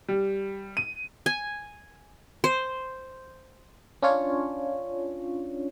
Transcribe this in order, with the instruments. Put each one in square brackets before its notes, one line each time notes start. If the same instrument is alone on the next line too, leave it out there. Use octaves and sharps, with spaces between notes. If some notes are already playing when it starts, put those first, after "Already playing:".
[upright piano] G3
D#7
[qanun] G#5
C5
[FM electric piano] C#4 D4 F4 C#5